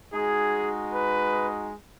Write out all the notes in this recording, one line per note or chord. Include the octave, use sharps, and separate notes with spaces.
G#3 D#4 F#4 G#4
B4